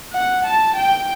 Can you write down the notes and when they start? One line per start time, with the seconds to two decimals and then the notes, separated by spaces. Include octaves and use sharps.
0.13 F#5
0.45 A5
0.76 G5